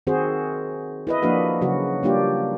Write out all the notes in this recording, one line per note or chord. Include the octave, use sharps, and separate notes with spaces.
D#3 C4 F#4 G#4 C5
E4 B4 D#5
F3 A#3 D4 F#4 B4 F5
C#3 F#3 F#4
G3 A#3 D4 F4 G4